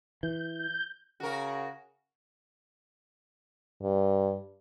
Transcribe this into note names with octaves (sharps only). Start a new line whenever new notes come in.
E3 G6
C#3 F#4 A#4
G2